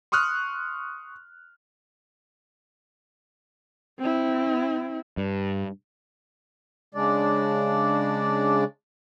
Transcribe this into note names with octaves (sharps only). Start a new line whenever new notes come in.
C6 C#6 D#6 F6 F#6
C4 E4
G2
C#3 G#3 D4 D5